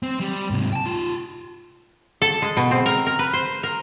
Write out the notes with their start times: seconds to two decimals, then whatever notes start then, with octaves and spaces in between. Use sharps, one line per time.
0.03 C4
0.20 G3
0.50 G#2 C3
0.73 G5 A5
0.86 D#4 F4
2.22 A4
2.42 G#3
2.57 B2
2.71 C4
2.86 A#4
3.06 A#4
3.19 B4
3.33 C5
3.63 A#4